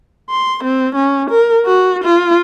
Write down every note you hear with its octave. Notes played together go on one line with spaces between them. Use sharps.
C6
C4
C#4
A#4
F#4
F4